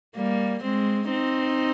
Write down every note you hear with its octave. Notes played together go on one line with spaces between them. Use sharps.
G3 A#3
G#3 C4
C4 D#4